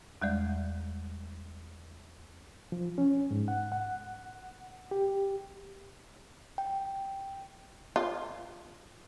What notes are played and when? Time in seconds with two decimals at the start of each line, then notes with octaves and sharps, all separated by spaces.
0.22 E2 G3 G#3 D5
2.72 F3
2.98 C#4
3.31 G#2
3.48 F#5
3.72 F#5
4.91 G4
6.58 G5
7.96 F4